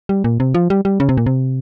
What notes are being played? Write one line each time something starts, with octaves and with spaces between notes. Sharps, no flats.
G3
A#2
C3
F3
G3
G3
C#3
C3
A#2
C3